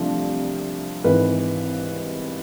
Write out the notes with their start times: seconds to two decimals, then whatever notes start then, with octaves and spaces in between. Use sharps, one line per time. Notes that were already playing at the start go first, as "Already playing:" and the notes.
Already playing: C2 C3 F3 A3 D4
1.04 G#1 G#2 E3 B4